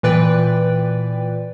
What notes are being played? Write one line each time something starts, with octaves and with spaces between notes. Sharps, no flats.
A#2 E3 B4 D5 G5